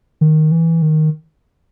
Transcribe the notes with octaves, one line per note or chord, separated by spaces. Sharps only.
D#3
E3
D#3